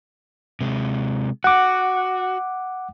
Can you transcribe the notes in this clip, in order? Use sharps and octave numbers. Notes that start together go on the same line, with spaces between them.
C3 G#3
F#4 F#5 D6